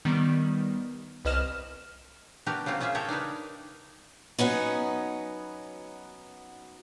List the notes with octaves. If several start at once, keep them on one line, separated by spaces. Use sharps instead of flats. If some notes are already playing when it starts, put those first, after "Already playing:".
D#3 G3 B3
C2 B4 D#5 F6 E7
B3 D4 F#4 G4 A#4 B4
C#3 F#3 A#3 C4 F4
C#4 F4 G#4 E5
G4 A4 A#4 C#5 E5 G5
D4 D#4 A#4 B4
F#3 B3 C#4 D#4